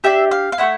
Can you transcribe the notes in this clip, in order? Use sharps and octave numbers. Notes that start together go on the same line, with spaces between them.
D4 G4 E5
F5
F5
A3 C4 E4 F#5